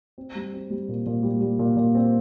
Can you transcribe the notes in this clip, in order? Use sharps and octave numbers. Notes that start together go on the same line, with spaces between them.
C4
G3
C4
G3
A#2
A#2
G3
G3
A#2
A#2
C4